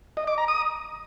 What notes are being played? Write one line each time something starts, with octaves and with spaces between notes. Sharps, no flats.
D#5
D6
A#5
D#6